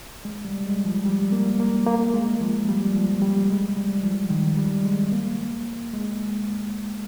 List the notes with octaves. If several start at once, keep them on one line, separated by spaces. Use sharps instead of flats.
G#3
G3
G#3
F3
G3
A#3
A#3
A#3
G#3
F3
G3
F3
G3
G#3
G3
F3
D#3
G3
G#3
A#3
G#3